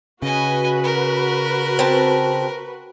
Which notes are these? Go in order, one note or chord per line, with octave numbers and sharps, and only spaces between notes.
C#3 F#4 B4 D#5 G#5
A#4
C4 A5